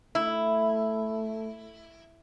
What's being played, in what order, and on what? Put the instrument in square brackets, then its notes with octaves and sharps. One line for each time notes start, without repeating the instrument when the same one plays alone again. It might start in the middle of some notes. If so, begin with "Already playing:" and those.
[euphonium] A3 [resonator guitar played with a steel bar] E4